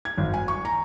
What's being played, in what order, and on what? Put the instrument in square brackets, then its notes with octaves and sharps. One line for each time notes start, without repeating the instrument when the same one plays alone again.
[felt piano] G#6
G#1
G#5
C#6
A#5